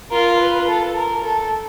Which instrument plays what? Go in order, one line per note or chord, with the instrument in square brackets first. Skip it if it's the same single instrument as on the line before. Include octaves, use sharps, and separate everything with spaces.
[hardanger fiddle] F4 [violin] A#4
[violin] B4
A4
A#4
A4